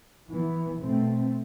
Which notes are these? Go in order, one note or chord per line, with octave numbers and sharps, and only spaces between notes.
E3 B3
B2 A3 C4